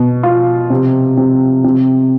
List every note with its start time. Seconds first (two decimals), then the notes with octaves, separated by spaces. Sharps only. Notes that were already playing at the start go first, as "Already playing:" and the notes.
Already playing: B2
0.23 F4
0.70 C3
1.17 C3
1.64 C3